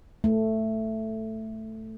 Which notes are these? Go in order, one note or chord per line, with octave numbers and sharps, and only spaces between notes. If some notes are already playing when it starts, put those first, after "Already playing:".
A3